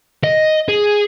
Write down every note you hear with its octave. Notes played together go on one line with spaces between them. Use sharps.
D#5
G#4